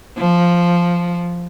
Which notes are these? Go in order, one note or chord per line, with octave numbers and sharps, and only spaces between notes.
F3